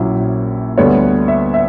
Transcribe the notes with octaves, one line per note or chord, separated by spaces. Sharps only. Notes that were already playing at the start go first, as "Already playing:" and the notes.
Already playing: A#1 A#2 F#3 C#4 E4
D2 D3 G3 B3 C#5
E5
E5